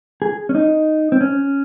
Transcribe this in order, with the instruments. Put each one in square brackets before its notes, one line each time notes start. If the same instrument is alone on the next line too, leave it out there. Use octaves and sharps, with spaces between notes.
[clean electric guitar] G#4
C#4
D#4
C4
C#4